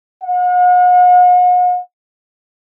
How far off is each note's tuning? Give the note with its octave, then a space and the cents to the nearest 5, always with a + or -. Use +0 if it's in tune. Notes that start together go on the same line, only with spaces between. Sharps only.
F#5 -45